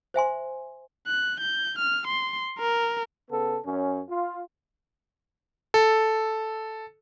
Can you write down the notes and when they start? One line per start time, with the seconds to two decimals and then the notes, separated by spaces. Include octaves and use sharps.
0.14 C5 E5 G#5 C6
1.07 F#6
1.40 G6
1.79 F6
2.07 C6
2.59 A#4
3.31 C#3 B3 A4
3.66 F#2 C#4
4.10 F4
5.74 A4